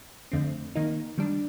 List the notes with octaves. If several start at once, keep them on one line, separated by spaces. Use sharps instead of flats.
F2 D3 A3 C4
D#3 A#3 D#4
D#3 G3 D4